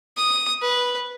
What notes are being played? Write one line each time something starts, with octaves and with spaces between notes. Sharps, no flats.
D#6
B4